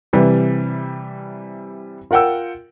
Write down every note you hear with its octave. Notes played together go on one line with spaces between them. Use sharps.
C3 E3 G3
F4 A#4 F#5 G5 E6